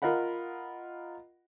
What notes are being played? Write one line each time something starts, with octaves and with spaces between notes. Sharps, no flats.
F4 A#4 D#5 F#5 B5